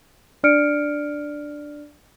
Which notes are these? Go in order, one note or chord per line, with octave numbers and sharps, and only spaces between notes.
D4 D5 F6 C#7 D7